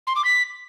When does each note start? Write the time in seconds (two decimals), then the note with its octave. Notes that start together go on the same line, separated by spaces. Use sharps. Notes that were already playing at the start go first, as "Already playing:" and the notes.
0.07 C6
0.16 D6
0.25 B6